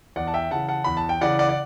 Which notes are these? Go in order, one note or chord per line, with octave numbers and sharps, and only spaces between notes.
E2 D5 F#5
A5
E5 G5
C#3 E3 F#5 A5
F#5 A5
E2 B5
A5
G5
C#3 E3 D5 F#5
D5 F#5
D5